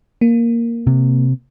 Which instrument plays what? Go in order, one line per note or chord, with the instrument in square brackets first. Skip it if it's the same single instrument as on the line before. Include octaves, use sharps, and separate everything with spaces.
[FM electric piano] A#3
[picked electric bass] C3